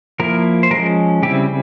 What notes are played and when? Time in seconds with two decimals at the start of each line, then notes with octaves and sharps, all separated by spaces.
0.20 F3 A#3 E4 A#4
0.63 C5
0.71 F3 G#3 C#4 A#4
1.23 C#3 G3 C4 E4 G4